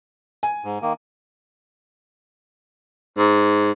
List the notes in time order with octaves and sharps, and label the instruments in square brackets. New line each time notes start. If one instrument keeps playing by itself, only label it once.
[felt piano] G#5
[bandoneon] G#2
D#3 A#3
[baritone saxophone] G#2